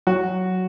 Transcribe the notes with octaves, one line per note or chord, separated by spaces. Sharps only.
F#3 F#4